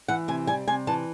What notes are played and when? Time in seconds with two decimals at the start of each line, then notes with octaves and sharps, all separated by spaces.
0.08 E3 F#5
0.28 C3 G#5
0.47 G3 G#5
0.68 C3 G#5
0.87 E3 A5